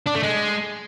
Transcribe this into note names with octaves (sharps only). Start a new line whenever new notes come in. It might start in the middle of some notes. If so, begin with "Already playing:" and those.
D4
A3
G#3